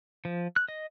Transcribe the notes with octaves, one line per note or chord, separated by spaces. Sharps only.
F3
F#6
D#5